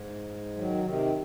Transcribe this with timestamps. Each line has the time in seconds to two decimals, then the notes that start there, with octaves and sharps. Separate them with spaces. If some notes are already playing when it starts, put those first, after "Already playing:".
Already playing: G#2
0.56 D#3 F#3
0.84 C3 D#3